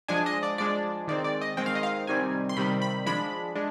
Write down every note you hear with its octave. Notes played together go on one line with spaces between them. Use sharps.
F3 G#3 D4 G#5
D#5
D5
F3 G#3 D4 D5
D#3 G#3 C4 D5
D5
D#5
D#3 G#3 C4 G5
F5
D#5
F5
C3 D#3 G3 C4 G#5
C6
C3 D#3 G3 C4 B5
B5
F3 G#3 D4 B5
G#3 D4